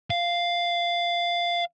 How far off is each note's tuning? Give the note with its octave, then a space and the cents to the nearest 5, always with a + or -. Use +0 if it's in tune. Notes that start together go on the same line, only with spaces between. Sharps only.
F5 -5